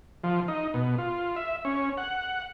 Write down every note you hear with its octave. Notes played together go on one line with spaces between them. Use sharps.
F3
D#4
B2
F4
E5
C#4
F#5